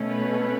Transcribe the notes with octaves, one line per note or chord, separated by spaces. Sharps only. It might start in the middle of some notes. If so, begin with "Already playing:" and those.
Already playing: B2 A3 C#4
B4